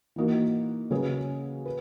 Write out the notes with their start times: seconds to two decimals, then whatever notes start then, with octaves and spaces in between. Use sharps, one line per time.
0.16 E3 A#3 D#4 F#4
0.90 C#3 F#3 C#4 G#4 B4
1.65 B4